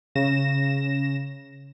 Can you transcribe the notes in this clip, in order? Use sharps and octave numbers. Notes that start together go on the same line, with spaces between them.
C#3 A#6 E7